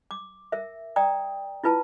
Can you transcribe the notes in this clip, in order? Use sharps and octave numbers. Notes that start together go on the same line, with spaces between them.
D6
A#4 E5
D5 G5 A#5 D#6
E4 F4 B4 A5